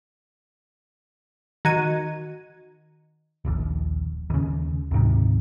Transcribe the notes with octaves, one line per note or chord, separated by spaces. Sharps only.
D#3 F#4 G#6 D#7
D#1 A#1 D#2
D#2 C#3
D2 G#2 C3 D#3